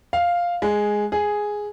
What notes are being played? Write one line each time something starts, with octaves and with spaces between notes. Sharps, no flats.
F5
G#3
G#4